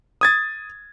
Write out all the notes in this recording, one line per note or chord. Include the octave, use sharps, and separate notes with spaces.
D#6 G#6 A6